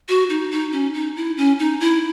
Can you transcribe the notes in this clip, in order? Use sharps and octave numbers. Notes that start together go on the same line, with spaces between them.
F#4
D#4
D#4
C#4
D#4
E4
C#4
D#4
E4